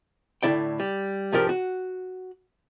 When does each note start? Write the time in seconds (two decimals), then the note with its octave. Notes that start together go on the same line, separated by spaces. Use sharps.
0.43 A2 D3 E4 D5 G5
0.80 G3
1.32 C2 G#2 F3 D4 G4 A#4
1.49 F#4